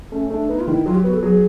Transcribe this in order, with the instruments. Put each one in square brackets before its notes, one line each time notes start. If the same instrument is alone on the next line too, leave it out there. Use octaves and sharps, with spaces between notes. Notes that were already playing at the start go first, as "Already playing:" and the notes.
[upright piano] A3 [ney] C#4
[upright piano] A3 [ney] D4
[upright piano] B3 [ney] D#4
[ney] F4
[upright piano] D#3 [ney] E4
[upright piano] F#3 [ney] F4
[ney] G4
[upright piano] B3 [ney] F#4
[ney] A4
[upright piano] F#3 [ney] G#4